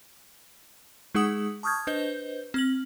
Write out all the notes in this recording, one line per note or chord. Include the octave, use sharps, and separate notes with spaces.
G#3 D#4 G#4 F#5 D#6 F#7
A5 C#6 D#6 F6 G6 G#6
D4 B4 C5 D#5 G6 G7
C4 F6 F#7